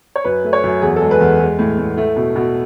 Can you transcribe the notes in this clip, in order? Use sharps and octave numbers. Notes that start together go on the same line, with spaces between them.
C#5
F#2 B4
A3
C#5
F#2
E2 G#4
G#3 A4
B4
E2
G#3
A2
A2
A3
B2
B2